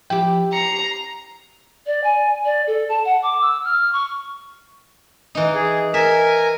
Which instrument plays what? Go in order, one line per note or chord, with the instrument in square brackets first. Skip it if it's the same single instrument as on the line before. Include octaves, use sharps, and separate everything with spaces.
[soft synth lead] F3 [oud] E4 G4 [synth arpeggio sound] G5
[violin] A#5 [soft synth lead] C7 [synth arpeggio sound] C#7
[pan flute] D5
G#5
D5
A4
A5
F#5
D6
E6
F6
C#6
[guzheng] E3 D#4
[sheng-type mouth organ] G#4
[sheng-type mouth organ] A#4 G#5 [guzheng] E5